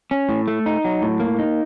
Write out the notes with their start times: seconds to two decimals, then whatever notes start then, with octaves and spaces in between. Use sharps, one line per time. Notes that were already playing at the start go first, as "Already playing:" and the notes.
0.11 C#4
0.29 A2
0.48 A3
0.66 D#4
0.84 F#3
1.02 A2
1.20 A#3
1.39 D#4